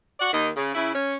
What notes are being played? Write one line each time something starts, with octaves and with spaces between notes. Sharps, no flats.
F#4 D5 F#5
D#2 D#3 D#5
C#3
C#3 E4
C#4